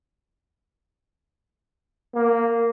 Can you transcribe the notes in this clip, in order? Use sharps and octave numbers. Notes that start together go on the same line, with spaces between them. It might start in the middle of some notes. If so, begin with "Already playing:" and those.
A#3